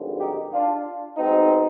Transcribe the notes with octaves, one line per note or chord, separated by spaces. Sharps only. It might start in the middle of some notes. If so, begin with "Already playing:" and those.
Already playing: G#1 G2 D3 F3
D#4 G4
D4 F4
B1 B2 G#3 C4 D#4